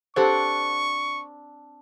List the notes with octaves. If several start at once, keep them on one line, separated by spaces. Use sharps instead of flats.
C4 D4 G4 A4 C5 F#5 C#6